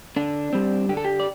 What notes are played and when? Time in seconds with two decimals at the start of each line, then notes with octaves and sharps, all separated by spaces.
0.16 D3 D4
0.53 G3 C4
0.89 D3 G4
0.97 A4
1.05 G4
1.20 D5